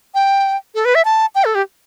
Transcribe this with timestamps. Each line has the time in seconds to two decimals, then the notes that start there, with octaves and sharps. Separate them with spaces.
0.14 G5
0.75 A4
0.85 B4
0.95 E5
1.05 A5
1.35 G5
1.45 A4
1.55 G4